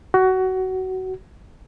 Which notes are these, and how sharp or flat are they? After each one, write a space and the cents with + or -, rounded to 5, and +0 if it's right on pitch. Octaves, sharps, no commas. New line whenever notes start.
F#4 +20